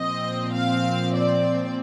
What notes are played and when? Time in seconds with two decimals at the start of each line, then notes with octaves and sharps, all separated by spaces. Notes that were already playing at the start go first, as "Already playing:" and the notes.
Already playing: A#2 F3 C4 D#5
0.53 F5
1.14 D5